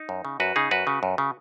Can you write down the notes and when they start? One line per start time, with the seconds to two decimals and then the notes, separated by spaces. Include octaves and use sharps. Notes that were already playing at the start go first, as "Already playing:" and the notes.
Already playing: D#4
0.09 F#2
0.25 C#3
0.40 F#2 F#4 B4
0.56 C#3 D#4 G#4
0.71 F#2 F#4 B4
0.87 C#3
1.03 F#2
1.18 C#3